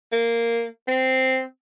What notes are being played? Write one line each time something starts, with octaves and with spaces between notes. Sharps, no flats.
A#3
C4